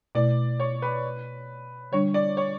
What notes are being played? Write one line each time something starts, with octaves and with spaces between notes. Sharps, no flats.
B2 A3 E4 D5
C#5
B4
D3 G3 D4 C#5
D5
C#5